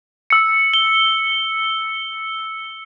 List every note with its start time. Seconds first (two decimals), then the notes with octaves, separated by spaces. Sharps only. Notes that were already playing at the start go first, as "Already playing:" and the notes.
0.30 E6 C#7
0.74 G7